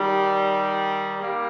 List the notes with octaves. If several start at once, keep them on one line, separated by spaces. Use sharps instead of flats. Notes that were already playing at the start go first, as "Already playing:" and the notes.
Already playing: D#3 G3
G3 A#3